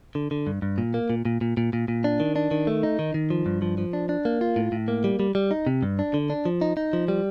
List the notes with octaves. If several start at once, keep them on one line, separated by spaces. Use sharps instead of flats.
D3
D3
G2
G2
A#2
A#3
A#2
A#2
A#2
A#2
A#2
A#2
D4
D#3
D4
D#3
A3
D#4
D#3
D#3
F3
G2
F3
F3
D4
D4
A#3
F4
A2
A2
A#3
G3
G3
G3
D#4
C3
G2
D4
D3
D4
F3
D#4
D#4
F3
G3